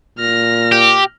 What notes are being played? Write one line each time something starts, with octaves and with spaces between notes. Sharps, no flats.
A#2 F6 A#6
G4